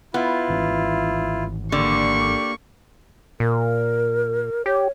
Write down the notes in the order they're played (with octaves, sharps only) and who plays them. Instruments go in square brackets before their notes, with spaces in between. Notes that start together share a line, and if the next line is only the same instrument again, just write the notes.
[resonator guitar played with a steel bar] B3 [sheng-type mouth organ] E4 F4
[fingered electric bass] G#1 E3 C#4
[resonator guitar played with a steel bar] D3 [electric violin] A#3 C#6 [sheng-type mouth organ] G4 D5
[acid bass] A#2 [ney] A#4
[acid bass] G4 [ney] C#5